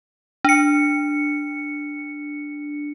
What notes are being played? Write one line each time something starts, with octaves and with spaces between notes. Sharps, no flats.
D4 C#7